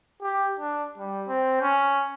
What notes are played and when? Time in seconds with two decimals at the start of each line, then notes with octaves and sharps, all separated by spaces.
0.22 G4
0.59 D4
0.98 G3
1.28 C4
1.61 C#4